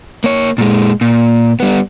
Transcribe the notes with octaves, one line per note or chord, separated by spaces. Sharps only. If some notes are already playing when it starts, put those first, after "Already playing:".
A#3 C#5
A#2 G#3
A#2
G3 B3